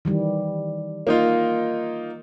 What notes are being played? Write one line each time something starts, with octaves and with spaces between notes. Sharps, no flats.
D#3 E3 G3
A#3 D#4 F4